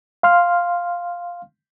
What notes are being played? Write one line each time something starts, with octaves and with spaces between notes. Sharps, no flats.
F5 C6 F6